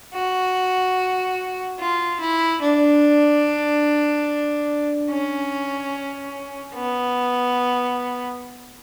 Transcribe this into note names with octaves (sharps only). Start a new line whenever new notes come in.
F#4
F4
E4
D4
C#4
B3